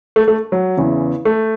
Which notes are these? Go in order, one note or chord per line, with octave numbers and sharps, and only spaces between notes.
A3
A3
F#3
E2 C#3 E3
A3